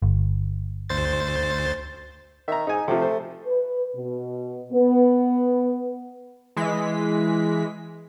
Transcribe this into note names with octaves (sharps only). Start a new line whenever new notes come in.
G1
D2 C5 A6
D#3 E5 A#5
G#2 D#4 G#5
C3 F3 A3
C5
B4
B2
B3
E3 G#3 B6